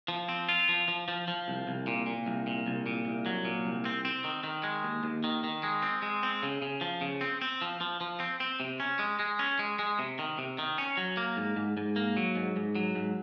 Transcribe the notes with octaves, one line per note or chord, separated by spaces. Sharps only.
F3
C4
F4
F3
F3
F3
F3
C2
C2
A#2
A#2
C2
A#2
C2
A#2
C2
F#3
A#2
C2
C4
C4
D#3
D#3
G#3
D#2
D#2
D#3
D#3
G#3
C4
G#3
C4
C#3
C#3
F3
C#3
C4
C4
F3
F3
F3
C4
C4
C3
C#4
G#3
G#3
C#4
G#3
G#3
C3
D#3
C3
D#3
C#4
F#3
A#3
G#2
G#2
G#2
A#3
F#3
G#2
G#2
F#3
G#2